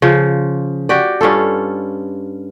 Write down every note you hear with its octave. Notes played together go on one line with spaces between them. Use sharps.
C#3 F3
F#4 G4 D5
G2 C#4 F4 A4